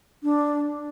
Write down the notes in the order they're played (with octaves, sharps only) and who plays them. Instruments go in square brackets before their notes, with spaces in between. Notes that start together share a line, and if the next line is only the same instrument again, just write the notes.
[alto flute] D4